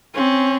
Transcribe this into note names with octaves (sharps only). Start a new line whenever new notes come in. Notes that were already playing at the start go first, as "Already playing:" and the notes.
C4 C#4